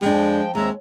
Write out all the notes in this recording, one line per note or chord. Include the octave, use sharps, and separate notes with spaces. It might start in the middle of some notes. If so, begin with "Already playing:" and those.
F2 F3 G#3 D4 G5
D#2 G#3 C4 E5 A#5